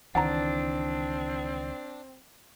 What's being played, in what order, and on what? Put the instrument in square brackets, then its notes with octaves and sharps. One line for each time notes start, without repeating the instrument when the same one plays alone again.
[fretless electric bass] C#2 D#3 E3 [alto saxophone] C4 [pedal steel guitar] D4 [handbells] F#5 A5 A#5